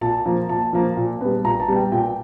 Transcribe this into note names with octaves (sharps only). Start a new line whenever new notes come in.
A#2 A5
F3 A#3
A#2 A5
F3 A#3
A#2
G3 B3
A#2 A#5
A5
G3 B3
G5
A#2 G5